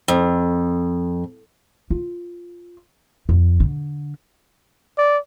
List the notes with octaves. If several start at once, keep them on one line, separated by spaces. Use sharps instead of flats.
F2
F4
F2
D3
D5